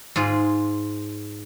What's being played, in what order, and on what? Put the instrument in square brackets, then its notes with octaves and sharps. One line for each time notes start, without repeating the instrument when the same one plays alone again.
[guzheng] G#2 F4 G#4